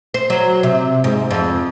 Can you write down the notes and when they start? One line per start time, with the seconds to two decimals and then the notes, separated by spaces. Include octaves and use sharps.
0.14 C5
0.30 F#3
0.63 C3
1.04 G#2
1.31 F2